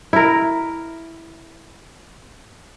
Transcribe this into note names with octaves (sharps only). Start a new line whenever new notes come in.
E4 A#4